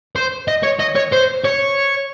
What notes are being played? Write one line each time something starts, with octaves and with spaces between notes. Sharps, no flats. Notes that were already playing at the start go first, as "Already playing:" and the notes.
C5
D#5
C#5
D#5
C#5
C5
C#5